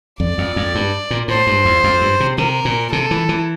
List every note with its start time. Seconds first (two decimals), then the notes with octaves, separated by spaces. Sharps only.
0.20 F2 D5
0.38 F2
0.56 F2
0.75 G2
1.11 A#2
1.28 A2 C5
1.47 G2
1.65 E2
1.84 F2
2.01 G2
2.20 C3
2.38 C3 A#4
2.65 A#2
2.92 C3 A4
3.11 E3
3.29 E3